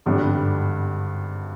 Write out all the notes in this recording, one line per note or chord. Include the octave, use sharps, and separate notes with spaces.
G#1 G2 D3 G3